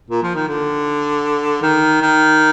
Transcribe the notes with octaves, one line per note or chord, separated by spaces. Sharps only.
A#2
F3
D#3
D3
D#3
D#3